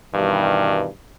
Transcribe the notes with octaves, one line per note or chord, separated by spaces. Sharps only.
G2 B2 D#3 E3 G3